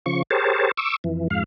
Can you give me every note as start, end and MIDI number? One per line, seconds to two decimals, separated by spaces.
0.06 0.23 49
0.06 0.23 53
0.06 0.23 85
0.31 0.71 67
0.31 0.71 68
0.31 0.71 70
0.31 0.71 72
0.31 0.71 73
0.31 0.71 81
0.77 0.96 85
0.77 0.96 86
0.77 0.96 88
1.04 1.28 41
1.04 1.28 52
1.30 1.43 41
1.30 1.43 44
1.30 1.43 77